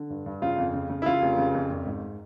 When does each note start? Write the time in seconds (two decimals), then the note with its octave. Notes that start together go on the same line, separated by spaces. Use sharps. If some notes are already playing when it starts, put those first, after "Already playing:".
Already playing: D3
0.10 G2
0.26 G2
0.42 C#3 F4
0.58 F2
0.74 C#3
0.90 C#3
1.02 E4
1.06 C#3 F4
1.22 F1
1.38 C#3
1.55 F2
1.70 G#1
1.87 G#2